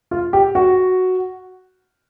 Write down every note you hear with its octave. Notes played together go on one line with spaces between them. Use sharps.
F4
G4
F#4